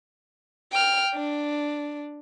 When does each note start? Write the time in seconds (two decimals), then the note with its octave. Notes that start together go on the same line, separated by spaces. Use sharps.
0.72 G5 F6
1.14 D4